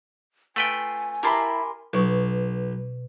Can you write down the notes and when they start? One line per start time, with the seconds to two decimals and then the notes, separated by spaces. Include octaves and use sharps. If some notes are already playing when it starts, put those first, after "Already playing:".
0.56 A3 F4 B4 G5 G#5
1.23 E4 G4 A#4 A5 B5 C6
1.93 B1 B2 C#6